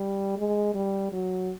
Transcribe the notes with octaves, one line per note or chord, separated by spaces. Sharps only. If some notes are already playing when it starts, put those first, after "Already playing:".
Already playing: G3
G#3
G3
F#3